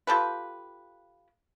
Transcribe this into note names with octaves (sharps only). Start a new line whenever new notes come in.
F4 G4 A4 B4